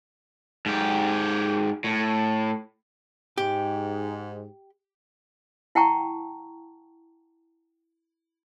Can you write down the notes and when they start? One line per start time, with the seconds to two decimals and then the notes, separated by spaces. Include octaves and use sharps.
0.66 G#2 G4
1.84 A2
3.38 G#2 G4
5.75 E4 F#5 G5 A5 A#5 C#6